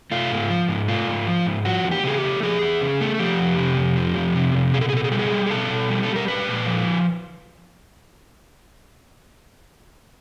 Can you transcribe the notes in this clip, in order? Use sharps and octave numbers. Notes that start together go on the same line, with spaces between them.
A3 F4
G#2
F3
G#2
A3 F4
G#2
F3
G#2
F3 F#4
E2
G4
C#3 G#4
G4
A3
F3 G#4
E2
C#3
A3
F3 G4
F2
C3
F2
F3
F2
C3
F2
B2 G#4
A4
G#4
B2 A4
G#4
G3 A4
G#4
G3
G#4
B2 A4
B2
G3
A4
G3
A#4
G#3 B4
A#2
F3